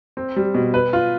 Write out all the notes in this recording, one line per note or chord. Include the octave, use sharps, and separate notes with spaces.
C4
G3
B2
B4
F4